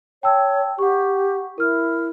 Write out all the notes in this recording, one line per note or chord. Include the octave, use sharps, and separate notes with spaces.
C#5 G5 A5 E6
G4 F#5 C#6
E4 A#4 F6